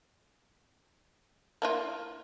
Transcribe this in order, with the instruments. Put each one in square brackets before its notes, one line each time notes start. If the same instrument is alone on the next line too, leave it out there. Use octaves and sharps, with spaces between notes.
[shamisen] A#3 E4 F4